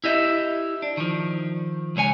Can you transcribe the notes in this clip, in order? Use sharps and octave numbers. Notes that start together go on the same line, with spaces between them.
E4 G4 D#5 E5
D4
D#3 F3
C#2 G#3 C#5 G#5